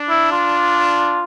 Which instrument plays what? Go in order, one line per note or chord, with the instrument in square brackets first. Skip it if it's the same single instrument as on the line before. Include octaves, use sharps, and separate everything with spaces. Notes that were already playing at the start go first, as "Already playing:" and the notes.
Already playing: [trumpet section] D4
[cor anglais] E4
F4